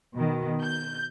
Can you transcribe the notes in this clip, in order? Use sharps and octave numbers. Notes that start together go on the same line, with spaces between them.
B2 D#3
G6